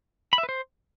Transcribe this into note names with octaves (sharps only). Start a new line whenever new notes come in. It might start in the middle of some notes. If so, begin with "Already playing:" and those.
B5
E5
B4
C5